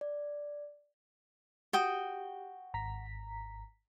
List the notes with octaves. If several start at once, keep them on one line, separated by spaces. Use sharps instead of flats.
D5
F#4 G4 G5 D#6
G#1 A#5 B6